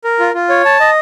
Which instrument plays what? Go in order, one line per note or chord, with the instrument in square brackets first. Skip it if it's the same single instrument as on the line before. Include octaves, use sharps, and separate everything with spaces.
[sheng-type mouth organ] A#4
F4
F4
C#5
A5
D#5